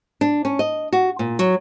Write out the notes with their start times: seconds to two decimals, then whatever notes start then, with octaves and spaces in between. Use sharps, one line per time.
0.21 D4
0.45 C#4
0.59 D#5
0.93 F#4
1.19 A#2
1.39 F#3